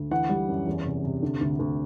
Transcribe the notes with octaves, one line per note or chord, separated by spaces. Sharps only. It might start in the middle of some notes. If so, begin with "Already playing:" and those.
Already playing: D2
E3 F#5
G3
F#2
E2
C3
C3
D3
D2
D2